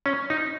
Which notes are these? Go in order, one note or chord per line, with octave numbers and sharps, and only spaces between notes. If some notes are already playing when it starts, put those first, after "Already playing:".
C#4
D#4